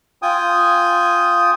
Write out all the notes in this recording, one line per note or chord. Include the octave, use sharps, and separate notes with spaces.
F4 G5 G#5 D#6